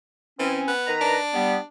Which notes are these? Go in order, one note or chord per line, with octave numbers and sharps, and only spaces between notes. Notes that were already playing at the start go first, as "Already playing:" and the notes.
E3 C4 C#4
B3
D#3 B4 A#5
D4
G3 B3